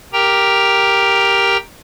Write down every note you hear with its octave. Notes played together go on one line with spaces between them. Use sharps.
G4 A#4 G5 A#5